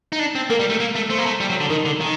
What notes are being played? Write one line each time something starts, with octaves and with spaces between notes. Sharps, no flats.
D#4
D4
C4
A#3 A#4
G3
A3
A#3
A3
A3 C5
A#3
A3
G3
F#3
D3
D#3 A#4
D3
D#3